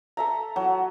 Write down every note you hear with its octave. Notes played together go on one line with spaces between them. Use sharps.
A4 E5 A#5
F#3